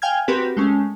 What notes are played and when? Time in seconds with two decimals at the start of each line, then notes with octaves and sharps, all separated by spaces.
0.02 F5 G5 G#5 F6 G#6
0.28 C4 F#4 G4 A#4 B4
0.57 G#3 A3 C#4